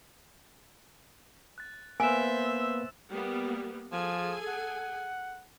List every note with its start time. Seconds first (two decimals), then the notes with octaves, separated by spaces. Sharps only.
1.58 F#6 A6
2.00 A#3 B3 B4 C5 E5 G#5 E6 E7
3.10 G3 A#3 B3
3.92 F3 G#4 A4 G#5
4.47 F#5